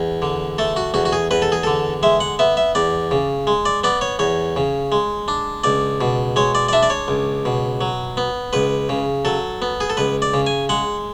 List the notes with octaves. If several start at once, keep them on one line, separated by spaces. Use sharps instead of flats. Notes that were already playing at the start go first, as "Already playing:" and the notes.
Already playing: E2
D3
A3 A4
F#4
E2 F#4
F#4
G#4
E2 B4
A4
G#4
D3 A4
G#3 E5
F#5
B3 E5
E5
E2 D5
C#3
G#3
D5
B3 D5
C#5
E2 C#5
C#3
G#3
D4
C#2 D5
B2
G#3 C#5
D5
D5
D4 E5
D5
C#5
C#2
B2
F#3
B3
C#2 B4
C#3
F#3 A4
B3
G#4
A4
C#2 B4
D5
C#3
G#5
G#3 F#5